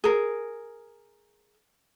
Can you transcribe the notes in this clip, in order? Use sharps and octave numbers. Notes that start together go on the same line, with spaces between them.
G#4 A#4